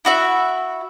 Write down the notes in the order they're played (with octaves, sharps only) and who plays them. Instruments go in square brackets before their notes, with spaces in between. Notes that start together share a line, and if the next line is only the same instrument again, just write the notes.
[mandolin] E4 F#4 E5